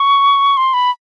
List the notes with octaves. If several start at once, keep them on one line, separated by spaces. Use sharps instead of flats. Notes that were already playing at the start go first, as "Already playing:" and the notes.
Already playing: C#6
C6
B5